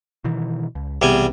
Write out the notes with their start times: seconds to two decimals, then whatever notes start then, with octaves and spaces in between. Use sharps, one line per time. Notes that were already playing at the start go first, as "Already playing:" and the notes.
0.24 B2 D#3 E3
0.75 C#2
1.02 B1 E2 C3 G3 G#5